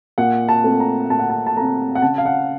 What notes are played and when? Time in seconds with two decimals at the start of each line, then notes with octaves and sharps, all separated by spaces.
0.18 A#2 F#5
0.49 A5
0.64 A3 C4
0.80 A#5
1.10 A#2 A5
1.19 F#5
1.30 A5
1.47 A5
1.57 A3 C4 A#5
1.95 F#5
2.02 C#3 A5
2.18 F5
2.25 F#5